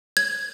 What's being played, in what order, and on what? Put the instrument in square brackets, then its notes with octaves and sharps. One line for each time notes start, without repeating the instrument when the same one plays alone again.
[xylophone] G#6